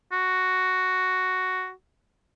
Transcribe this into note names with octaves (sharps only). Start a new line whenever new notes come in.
F#4